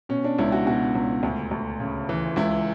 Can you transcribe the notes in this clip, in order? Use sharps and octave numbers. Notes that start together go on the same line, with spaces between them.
B2 C#4
D4
C#2 E4
F#4
B2 F#4
C#2
D2
D2
C#3
E3
C#2 E4